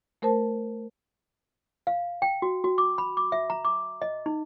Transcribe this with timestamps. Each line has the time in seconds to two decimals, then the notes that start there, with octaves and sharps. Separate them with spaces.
0.22 A3 A#4 C5 A5
1.87 F5
2.22 G5
2.42 F#4
2.64 F#4
2.78 D6
2.98 B5
3.17 D6
3.32 E5
3.50 A#5
3.65 D6
4.02 D#5
4.26 D#4